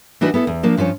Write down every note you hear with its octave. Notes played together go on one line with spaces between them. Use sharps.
E3 D4 D#4 F#4 B4
B3 E4 A4
E2
F3 A#3 D4
G2 F3 C#4 C#5